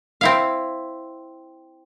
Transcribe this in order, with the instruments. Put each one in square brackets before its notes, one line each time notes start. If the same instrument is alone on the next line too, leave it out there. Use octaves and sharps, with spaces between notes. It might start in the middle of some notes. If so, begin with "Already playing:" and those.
[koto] C4 E4 F5